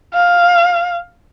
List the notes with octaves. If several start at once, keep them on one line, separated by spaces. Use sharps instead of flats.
F5